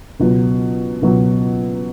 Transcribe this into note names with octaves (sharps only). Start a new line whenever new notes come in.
C#2 B2 F#3
C#2 B2 F#3